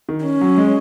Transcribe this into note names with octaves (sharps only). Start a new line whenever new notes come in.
D#3
C#4
F#3
G#3